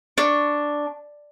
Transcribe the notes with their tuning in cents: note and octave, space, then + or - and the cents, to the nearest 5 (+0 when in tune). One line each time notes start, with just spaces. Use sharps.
D4 +0 C#6 +0